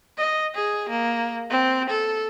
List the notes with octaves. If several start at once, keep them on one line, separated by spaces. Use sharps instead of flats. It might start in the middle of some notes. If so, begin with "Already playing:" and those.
D#5
G#4
A#3
C4
A4